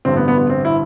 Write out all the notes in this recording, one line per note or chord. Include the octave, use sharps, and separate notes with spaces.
A1 G2 D3 C4
B3
B3
B3
C4
E4